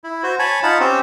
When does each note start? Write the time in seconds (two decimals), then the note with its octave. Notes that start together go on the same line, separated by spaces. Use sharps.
0.04 E4
0.23 F#4 C5
0.39 C#5 G#5 A5 B5
0.63 D#4 F4 F#5 A5 B5
0.80 C4 C#4 G4 C5